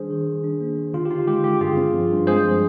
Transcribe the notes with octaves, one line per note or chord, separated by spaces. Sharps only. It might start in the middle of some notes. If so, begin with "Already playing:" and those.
Already playing: D#3 G3 D4 G#4 C5
D#3
D#3
D4
A#3
D#3
D3 F4
G4
D#4 F4
G#3 G4
D3 G4
G2 F4 G#4
C4
F3
G2
G#3 G#4 C5
F3